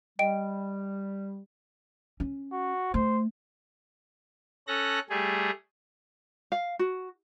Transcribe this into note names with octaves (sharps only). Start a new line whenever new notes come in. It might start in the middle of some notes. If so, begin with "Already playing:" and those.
G3 D#5 G5 D7
C#4
F#4
A3 C5
C#4 A4 F#6 A#6
G3 A3 G#4
F5
F#4